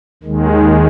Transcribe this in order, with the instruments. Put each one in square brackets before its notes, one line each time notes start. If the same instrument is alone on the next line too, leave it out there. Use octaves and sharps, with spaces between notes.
[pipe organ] D#2 D#3 G#3